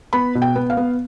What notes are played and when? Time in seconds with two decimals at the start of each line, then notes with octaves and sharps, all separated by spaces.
0.13 B3 B5
0.35 B2
0.42 G5
0.55 B3
0.70 F5
0.77 B3